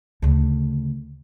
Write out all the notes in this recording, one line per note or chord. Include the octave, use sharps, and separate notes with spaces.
D2 C#3